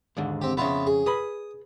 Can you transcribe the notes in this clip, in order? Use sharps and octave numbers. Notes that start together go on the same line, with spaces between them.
D#2 G#2 D3
C4 G4
F2 C#3 B3 E4 F4
G#4
G#4 B4 B5 D#6